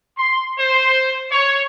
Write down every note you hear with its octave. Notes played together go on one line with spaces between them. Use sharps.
C6
C5
C#5